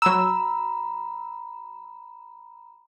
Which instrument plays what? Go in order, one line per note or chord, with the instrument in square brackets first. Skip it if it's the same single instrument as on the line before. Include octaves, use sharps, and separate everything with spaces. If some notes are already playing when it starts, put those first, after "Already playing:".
[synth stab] F#3 E6 [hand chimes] A#5 B5